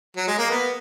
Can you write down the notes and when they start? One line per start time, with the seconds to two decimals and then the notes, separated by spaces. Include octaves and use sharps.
0.16 F#3
0.28 G#3
0.38 A#3
0.50 B3